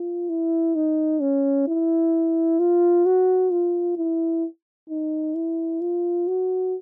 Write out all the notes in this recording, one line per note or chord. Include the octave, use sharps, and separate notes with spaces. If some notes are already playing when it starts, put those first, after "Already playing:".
Already playing: F4
E4
D#4
C#4
E4
F4
F#4
F4
E4
D#4
E4
F4
F#4